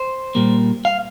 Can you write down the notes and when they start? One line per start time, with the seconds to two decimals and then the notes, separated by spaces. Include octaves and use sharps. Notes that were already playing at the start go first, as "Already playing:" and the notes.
Already playing: C5
0.35 A#2 G3 A#3
0.85 F5